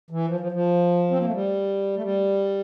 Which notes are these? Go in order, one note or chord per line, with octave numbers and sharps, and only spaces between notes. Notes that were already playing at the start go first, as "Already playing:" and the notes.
E3
F3
F3
F3
C4
A#3
A3
G3
A3
G3